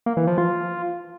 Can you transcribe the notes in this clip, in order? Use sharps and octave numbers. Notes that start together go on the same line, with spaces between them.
A#3
E3
F3
F4